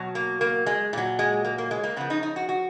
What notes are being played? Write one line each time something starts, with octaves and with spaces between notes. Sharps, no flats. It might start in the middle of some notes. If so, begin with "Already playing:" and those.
Already playing: B2 F#3
A#3
A#3
G#3
A#2 F#3
G#3
A#3
A#3
G#3
A#3
C#3 F3 B3
D#4
D#4
F#4
F#4